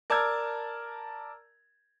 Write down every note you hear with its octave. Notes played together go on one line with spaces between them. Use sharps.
A#4 D5 A5 E6 F6 G#6